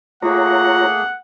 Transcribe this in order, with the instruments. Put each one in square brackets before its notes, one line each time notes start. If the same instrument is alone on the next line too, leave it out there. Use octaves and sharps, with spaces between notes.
[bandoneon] A3 A#3 G#4 [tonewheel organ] F4 C#5 A#5 [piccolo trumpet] F#5